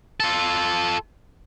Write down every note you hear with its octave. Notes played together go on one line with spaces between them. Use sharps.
F4 A4